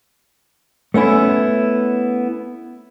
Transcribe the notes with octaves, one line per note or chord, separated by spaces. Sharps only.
A3 B3 C#4 E4